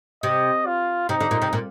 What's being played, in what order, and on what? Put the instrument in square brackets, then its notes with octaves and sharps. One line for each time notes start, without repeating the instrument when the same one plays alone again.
[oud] C3 [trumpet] D#5
[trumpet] F4
[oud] C3 [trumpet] D#4
[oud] D3
A#2
C3
A#2